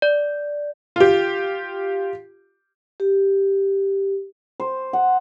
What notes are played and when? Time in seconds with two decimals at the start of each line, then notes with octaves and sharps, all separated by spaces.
0.02 D5
0.96 F4 G4
3.00 G4
4.60 C5
4.93 F#5